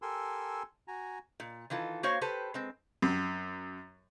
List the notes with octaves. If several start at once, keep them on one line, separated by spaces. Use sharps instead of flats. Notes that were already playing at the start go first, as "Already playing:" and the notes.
G4 A4 A#4 G#5 C6 E6
F#4 G#5 A#5
A#2
D#3 E3 F4 A4
A#3 F#4 C5 C#5 F5
G4 A4 B4 C5
G#3 C4
F#2